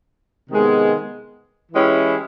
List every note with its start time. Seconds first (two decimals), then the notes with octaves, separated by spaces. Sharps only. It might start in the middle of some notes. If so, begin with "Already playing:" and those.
0.50 C3 D#3 G#3 B3
1.72 E3 G#3 C#4 E4 G4